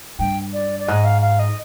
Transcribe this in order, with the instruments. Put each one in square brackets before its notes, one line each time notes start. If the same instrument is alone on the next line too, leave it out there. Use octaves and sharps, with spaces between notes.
[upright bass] G2 [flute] G5
[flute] D5
D5
[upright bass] G#2 [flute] D#5
[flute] F5
F5
D#5